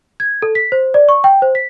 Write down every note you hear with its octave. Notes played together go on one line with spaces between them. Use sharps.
G#6
A4
B6
C5
D5
C#6
G5
C5
B6